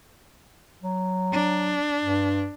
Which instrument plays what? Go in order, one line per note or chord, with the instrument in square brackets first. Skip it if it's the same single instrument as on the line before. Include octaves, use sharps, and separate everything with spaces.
[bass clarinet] F#3
[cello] D4
[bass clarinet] G2